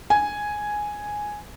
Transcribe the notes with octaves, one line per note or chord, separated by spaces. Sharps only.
G#5